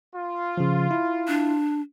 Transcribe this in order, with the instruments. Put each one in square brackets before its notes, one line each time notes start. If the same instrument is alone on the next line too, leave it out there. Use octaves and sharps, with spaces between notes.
[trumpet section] F4
[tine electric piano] C#3 F3
E4
[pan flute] D4